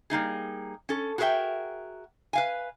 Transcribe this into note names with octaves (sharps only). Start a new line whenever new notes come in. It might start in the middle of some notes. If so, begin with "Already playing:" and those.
G3 A#3 D#4 G#4
C#4 A4
F#4 G#4 A#4 B4 E5 G5
B4 F5 G#5